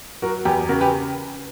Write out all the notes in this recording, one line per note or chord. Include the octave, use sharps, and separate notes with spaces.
F#3 F#4 A#4
E2 G4 B4
C#3 F#4 A#4
G4 B4